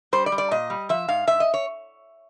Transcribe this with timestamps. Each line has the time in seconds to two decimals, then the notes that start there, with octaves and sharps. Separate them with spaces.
0.13 G3 C5
0.26 D5
0.32 G3
0.38 D5
0.51 A#2 D#5
0.70 G3
0.89 F3 E5
1.08 G#2 F5
1.27 G#2 E5
1.40 D#5
1.54 C#5